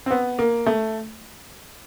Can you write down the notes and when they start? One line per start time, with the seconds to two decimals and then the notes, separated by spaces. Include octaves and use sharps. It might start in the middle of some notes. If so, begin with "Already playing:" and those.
0.06 C4
0.11 B3
0.39 A#3
0.66 A3